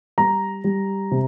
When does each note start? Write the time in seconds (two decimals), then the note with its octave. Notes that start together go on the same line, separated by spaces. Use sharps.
0.18 G3 A#5
0.64 G3
1.11 C3